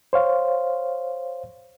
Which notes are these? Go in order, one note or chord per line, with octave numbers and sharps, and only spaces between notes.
C5 C#5 F5